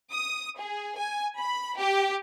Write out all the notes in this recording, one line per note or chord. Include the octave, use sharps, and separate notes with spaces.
D#6
G#4
G#5
B5
G4